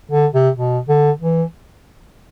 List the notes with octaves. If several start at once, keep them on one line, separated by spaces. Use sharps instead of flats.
D3
C3
B2
D3
E3